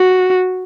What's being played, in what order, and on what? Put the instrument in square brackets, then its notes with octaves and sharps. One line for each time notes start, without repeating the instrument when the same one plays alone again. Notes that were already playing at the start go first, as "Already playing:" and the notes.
Already playing: [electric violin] F#4